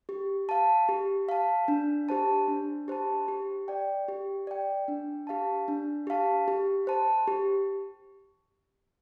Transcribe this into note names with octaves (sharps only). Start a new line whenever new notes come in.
G4
F5 A5
G4
F5 A5
D4
G4 C5 A5
D4
G4 C5 A5
G4
D5 G5
G4
D5 G5
D4
G4 F5 A5
D4
G4 F5 A5
G4
C5 A5
G4